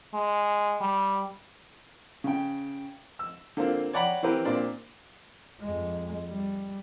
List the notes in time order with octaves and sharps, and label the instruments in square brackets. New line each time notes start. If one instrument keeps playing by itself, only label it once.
[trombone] G#3
G3
[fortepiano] C#3 G5
E6
D3 A#3 C4 F4
C#5 D5 F#5 G5 A#5 B5
E3 C4 G4 A#4 B4
A#2 A#3 C4 D4
[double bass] F2 G#3
G3